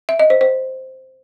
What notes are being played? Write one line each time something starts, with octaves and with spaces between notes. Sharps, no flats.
E5
D#5
C5
C5